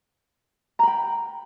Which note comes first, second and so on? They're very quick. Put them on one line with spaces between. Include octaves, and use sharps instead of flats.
A#5 B5 G5